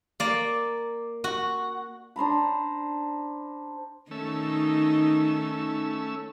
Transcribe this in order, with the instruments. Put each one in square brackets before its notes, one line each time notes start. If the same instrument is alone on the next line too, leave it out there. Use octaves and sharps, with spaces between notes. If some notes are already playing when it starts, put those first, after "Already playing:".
[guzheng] A#3 D5
F#4
[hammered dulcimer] D4 C5 A#5 B5
[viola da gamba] D#3 D#4 [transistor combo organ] A3 C#4 E6